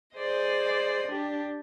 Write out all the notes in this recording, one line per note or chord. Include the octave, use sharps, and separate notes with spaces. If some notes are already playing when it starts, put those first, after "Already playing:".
G#4 C5 D5 D#5
D4 G4